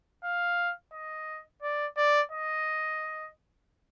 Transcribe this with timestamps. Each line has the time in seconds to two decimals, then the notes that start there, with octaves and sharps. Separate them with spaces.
0.24 F5
0.93 D#5
1.62 D5
1.97 D5
2.32 D#5